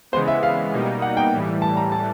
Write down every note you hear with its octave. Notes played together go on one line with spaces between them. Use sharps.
C#3 E3 G#3 B3 C5
E5
F5
B2 G3 A#3 D#4
F#5
G5
A2 E3 G3
A5
A#5
A5